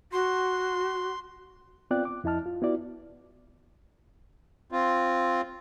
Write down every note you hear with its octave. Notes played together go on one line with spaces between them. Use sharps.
F#4 C6
B3 C4 F4 D5 G5 F#6
D6
F2 E4 D#5 A5 F6
F4
B3 E4 F#4 D5
C4 F4